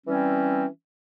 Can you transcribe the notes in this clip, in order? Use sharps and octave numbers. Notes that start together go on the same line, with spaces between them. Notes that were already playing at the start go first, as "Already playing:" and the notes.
E3 G3 C4 C#4